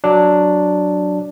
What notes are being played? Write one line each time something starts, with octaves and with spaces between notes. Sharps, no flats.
F#3 D4